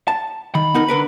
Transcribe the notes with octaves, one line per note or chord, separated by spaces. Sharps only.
A5
D#3 B5
B3 D#4 A#4
D3 A#4 B4